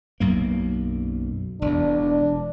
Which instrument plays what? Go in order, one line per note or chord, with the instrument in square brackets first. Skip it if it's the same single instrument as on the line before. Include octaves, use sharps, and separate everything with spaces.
[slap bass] B1 F#2 A#3
[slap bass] E1 E2 [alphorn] D4